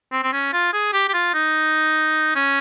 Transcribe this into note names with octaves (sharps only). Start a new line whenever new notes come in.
C4
C4
C#4
F4
G#4
G4
G4
F4
D#4
C#4